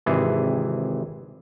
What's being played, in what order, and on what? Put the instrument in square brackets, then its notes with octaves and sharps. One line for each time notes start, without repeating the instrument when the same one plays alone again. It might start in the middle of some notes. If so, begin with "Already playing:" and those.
[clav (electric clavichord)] G#1 C3 E3 G#4